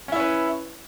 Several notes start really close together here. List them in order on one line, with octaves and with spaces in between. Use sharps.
C#4 E4 C#5 B4